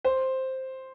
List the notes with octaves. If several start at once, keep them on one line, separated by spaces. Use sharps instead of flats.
C5